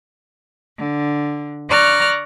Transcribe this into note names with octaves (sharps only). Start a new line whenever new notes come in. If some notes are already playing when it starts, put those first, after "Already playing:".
D3
D5 A#5 C#6 F6 F#6